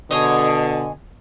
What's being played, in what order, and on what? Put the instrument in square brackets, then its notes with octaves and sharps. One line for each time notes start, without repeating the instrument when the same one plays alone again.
[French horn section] B2 D3 [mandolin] G#4 C#5 D#5